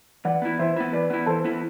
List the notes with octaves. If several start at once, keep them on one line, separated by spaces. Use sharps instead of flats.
E3 D5 F#5
B3 E4
E3 C5 E5
B3 E4
E3 B4 D5
B3 E4
E3 A4 C5
B3 E4